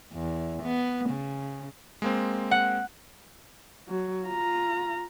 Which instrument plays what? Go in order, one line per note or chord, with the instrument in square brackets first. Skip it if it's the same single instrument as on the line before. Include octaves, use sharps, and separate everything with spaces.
[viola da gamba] E2
B3
C#3
[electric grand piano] G#3 A#3 C4
[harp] F#5
[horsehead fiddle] F#3
F4 A#5